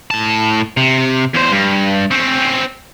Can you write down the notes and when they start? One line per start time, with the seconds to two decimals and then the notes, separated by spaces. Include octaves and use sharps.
0.11 A2 A5
0.77 C3
1.34 E2 C5
1.52 G2
2.11 C4 C#4